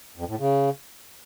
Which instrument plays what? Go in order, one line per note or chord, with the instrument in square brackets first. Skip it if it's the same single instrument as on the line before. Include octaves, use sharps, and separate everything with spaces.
[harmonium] F2
A2
C#3